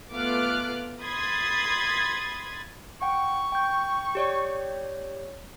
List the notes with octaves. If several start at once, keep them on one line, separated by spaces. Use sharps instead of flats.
A3 B3 F4 D6 F6 F#6
B5 C6 D#6 G#6 A6
F#5 G5 C#6
G5 G6
G4 C#5 D5